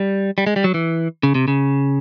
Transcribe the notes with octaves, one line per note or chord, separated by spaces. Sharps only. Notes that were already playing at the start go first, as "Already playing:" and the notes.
Already playing: G3
G3
G#3
G3
F#3
E3
C#3
C3
C#3